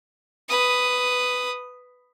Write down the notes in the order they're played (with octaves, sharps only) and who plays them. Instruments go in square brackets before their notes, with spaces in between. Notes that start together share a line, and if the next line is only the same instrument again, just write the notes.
[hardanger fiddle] B4 D#6